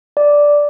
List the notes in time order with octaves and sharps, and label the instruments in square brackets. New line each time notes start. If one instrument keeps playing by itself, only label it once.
[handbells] D5